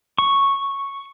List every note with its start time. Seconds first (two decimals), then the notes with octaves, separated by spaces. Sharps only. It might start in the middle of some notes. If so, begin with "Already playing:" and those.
0.18 C#6